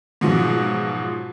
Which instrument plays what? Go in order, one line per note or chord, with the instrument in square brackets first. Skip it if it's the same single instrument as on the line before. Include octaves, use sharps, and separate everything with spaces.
[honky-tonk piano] G#2 B2 F3 F#3